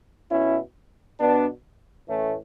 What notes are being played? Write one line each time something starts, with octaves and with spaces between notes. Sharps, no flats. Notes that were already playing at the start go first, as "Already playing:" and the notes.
B2 C#4 E4
B2 B3 D4
A2 E3 A3 C#4